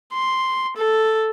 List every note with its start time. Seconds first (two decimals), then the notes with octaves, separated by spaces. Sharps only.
0.13 C6
0.76 A4